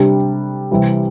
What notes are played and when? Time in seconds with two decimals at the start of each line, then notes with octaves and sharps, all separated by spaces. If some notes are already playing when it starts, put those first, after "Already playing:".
Already playing: C3 G3 D4
0.71 C3 E3 G3